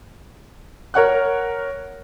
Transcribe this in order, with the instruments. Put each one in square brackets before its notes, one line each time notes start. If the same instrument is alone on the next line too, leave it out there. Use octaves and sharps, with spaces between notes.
[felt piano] A#4 C#5 F#5 F#6